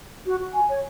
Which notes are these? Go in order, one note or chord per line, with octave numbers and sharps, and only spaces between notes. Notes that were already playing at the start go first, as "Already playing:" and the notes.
F#4
F#4
G#5
C#5